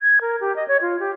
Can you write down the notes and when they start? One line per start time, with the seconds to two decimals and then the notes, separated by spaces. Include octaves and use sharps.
0.01 G#6
0.21 A#4
0.41 G4
0.56 D#5
0.68 C#5
0.82 F4
1.00 G4